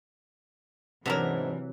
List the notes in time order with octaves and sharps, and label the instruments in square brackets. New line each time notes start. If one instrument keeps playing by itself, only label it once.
[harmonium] G#2 [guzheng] C3 F#3 [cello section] E3 [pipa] B3 D4 A#4